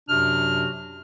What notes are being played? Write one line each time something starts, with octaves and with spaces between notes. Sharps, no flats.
F#2 C3 F#3 D4 F#4 F6